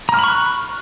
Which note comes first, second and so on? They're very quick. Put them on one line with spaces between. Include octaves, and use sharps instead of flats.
A#5 F6 B5 C#6 F#6